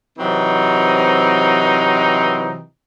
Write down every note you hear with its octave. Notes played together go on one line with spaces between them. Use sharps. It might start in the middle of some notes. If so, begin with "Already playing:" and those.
C3 E3 F#3 C4 D#4